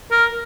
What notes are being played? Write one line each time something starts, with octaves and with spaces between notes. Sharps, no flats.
A#4